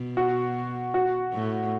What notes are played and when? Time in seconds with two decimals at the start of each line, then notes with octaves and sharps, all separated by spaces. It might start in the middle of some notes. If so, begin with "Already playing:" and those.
Already playing: B2
0.17 F#4
0.94 F#4
1.33 A2